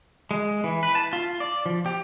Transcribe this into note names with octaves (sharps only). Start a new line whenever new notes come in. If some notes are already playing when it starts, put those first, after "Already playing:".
G#3
E3
B4
A5
F4
D5
F3
G4